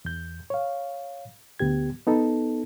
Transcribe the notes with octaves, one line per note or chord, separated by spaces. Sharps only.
E2 G6
C#5 F5
D2 B3 G4 G#6
B3 D#4 A4